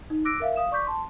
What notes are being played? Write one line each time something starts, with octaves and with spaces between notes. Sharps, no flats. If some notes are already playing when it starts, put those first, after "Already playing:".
D#4
D6 E6 F#6 A#6 D7
A#4 E5 F5
F5 D#6 E7
D5 C#6 D6 G6 B6
A5 C6